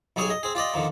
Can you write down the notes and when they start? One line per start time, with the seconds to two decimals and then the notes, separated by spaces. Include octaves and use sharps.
0.16 B1 F#3 G3 G#4 C#5 G#5
0.30 D#5
0.43 C4 G#4
0.55 F4 G4 D5 D#5
0.74 D3 D#3 F3 A#3